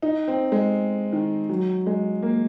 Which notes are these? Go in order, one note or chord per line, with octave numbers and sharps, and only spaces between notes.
D#4
C4
G#3
D#3
F#3
G#3
A#3